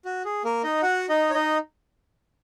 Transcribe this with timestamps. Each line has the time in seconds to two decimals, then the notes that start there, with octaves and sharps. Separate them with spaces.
0.05 F#4
0.25 G#4
0.45 A#3 A#4
0.63 D#4 D#5
0.82 F#4 F#5
1.09 D#4 D#5
1.30 C#5
1.34 D#4 D#5